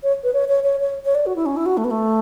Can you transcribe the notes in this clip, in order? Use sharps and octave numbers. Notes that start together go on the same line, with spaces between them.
C#5
B4
C#5
C#5
C#5
C#5
C#5
D5
F#4
E4
C#4
E4
F#4
A3
B3
A3